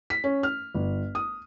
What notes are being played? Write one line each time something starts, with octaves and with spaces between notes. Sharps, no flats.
B6
C#4
F6
G1
D#6